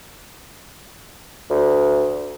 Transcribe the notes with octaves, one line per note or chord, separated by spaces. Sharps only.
D2